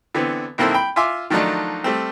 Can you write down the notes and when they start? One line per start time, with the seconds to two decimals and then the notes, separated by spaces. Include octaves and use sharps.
0.15 D3 E3 B3 C4
0.58 B1 D#3 A#3 C4 E4 A4
0.74 G5 B5
0.96 F4 E5 G#5 C6 D6
1.30 D#3 F3 F#3 A3 D4 D#4
1.84 G3 A3 C4